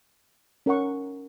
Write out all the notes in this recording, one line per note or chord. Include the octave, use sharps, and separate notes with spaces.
C#4 A#4 F#5 C#6